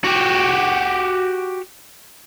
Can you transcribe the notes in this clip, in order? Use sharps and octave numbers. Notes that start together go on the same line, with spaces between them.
F#4 G4